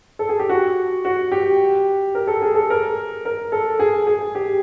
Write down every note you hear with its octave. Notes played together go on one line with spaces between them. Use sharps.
A4
G#4
G4
F#4
F#4
G4
A#4
A4
G#4
A4
A#4
A#4
A4
G#4
G#4
G4